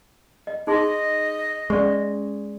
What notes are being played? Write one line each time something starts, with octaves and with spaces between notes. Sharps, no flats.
D#5
D#4 G#4 D#5 C6
G#3 C#4 D5 C#6